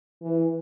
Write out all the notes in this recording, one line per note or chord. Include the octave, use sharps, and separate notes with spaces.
E3